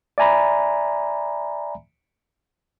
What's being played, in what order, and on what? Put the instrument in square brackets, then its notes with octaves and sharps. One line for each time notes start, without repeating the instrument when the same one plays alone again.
[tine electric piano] D5 E5 G#5 A#5 B5